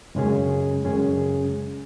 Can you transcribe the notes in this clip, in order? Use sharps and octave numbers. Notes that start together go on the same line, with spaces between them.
F#2 C#3 G#3 C#4 G#4
F#2 C#3 G#3 C#4 G#4